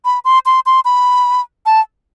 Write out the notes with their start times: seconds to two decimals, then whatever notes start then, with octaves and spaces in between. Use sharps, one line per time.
0.05 B5
0.25 C6
0.46 C6
0.66 C6
0.85 B5
1.66 A5